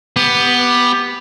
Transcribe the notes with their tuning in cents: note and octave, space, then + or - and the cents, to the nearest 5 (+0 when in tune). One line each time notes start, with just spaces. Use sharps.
B3 +0 G4 +15